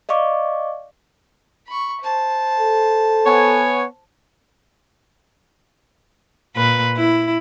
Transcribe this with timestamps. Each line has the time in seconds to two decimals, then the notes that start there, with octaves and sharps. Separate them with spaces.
0.09 D5 D#5 F5 C#6 D6
1.67 B5 C#6
2.02 C5 A5
2.60 A4
3.26 B3 C#5 G#5
6.56 A#2 B4
6.96 E4